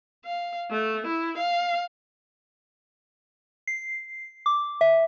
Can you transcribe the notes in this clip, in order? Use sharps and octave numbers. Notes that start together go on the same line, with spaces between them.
F5
A3
E4
F5
C7
D6
E5